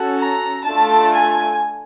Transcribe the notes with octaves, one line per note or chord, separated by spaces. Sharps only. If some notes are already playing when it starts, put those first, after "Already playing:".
Already playing: C#4 F#4 A4
A#5
A3 D4 F4 A4 A5
G#5